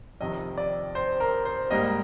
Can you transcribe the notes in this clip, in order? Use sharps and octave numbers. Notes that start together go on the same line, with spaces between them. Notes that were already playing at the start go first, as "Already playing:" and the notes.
F2 C3 D#3 D#5
D5
C5
A#4
C5
G#2 G3 A#3 D#5